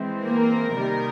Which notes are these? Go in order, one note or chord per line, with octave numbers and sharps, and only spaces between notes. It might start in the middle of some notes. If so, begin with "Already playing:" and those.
Already playing: E3 G#3 C4
A#3 A#4
C3 D#3 G3 A#3 D#4